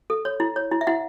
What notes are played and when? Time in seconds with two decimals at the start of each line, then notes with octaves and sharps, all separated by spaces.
0.10 A4
0.25 C#5
0.40 E4
0.56 C#5
0.71 E4
0.81 E5
0.87 E4 F#5